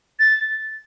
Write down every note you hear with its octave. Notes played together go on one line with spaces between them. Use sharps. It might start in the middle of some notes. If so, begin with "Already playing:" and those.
A6